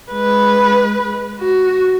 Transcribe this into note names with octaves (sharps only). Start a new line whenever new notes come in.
G#3 B4
F#4